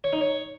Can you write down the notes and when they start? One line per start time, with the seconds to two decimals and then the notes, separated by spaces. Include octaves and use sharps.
0.04 C#5
0.13 D#4
0.21 C#5